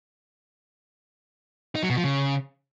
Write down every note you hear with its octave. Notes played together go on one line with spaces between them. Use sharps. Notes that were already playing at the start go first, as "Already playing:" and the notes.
D#4
F#3
B2
F3
C#3